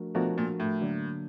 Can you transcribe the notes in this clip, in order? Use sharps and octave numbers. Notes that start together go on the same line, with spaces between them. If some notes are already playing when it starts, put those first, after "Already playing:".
Already playing: F3 A3 D4 F#4 A#4
B2 F3 A3 D4 F#4 A#4
A#2
A2
D3 F#3 A#3 D4